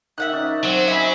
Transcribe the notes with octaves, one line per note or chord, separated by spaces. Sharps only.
D#3 E5 F#5 F#6
C#4 D#4 D5
F#3 C4
E5 G#5 B5